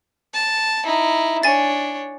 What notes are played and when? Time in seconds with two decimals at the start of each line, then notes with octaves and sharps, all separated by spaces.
0.34 A5
0.85 D#4 E4
1.43 D4 C#5 G#5 A6